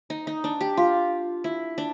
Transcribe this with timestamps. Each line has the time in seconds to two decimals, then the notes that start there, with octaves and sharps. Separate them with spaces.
0.10 D#4
0.27 D#4
0.44 D4
0.61 G4
0.77 F4
1.44 E4
1.78 D4